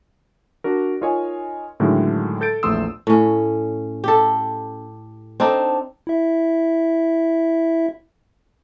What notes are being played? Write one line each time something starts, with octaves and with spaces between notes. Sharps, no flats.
D4 F#4 A#4
D#4 F4 A#4 C#5 D#5 G#5
A2 D3 D#3 F#3 G#3
A4 G6 A6 D7
A#1 E2 A3 C6 D#6 E6
A2 C#4
G4 A4
C4 D4 D#4 A4
E4 E5